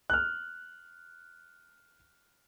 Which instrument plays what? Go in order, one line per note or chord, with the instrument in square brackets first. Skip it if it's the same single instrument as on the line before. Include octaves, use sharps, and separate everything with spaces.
[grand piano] F6 F#6